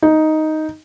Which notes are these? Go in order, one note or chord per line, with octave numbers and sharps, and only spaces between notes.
D#4